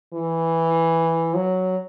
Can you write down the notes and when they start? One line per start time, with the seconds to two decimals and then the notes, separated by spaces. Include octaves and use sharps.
0.14 E3
1.34 F#3